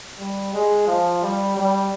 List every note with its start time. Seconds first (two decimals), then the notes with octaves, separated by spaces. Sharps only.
0.19 G3
0.54 G#3
0.87 F3
1.22 G3
1.57 G3